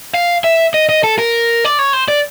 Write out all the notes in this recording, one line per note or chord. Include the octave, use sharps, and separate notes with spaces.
F5
E5
D#5
D#5
A4
A#4
D5
C#5
C5
D5